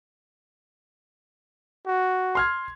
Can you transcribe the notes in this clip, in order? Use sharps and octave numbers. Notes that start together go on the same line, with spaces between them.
F#4
C6 F6 G#6